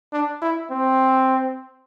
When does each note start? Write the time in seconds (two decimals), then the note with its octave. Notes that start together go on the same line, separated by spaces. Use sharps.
0.12 D4
0.42 E4
0.71 C4